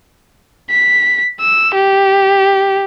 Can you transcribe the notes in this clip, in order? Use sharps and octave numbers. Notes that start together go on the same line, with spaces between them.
B6
E6
G4